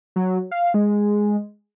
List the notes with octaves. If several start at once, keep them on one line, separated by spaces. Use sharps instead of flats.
F#3
F5
G#3